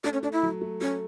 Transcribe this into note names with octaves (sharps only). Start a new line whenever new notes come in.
A3 D4
C#4
A3 D4
E4
F#3
A3
A3 C#4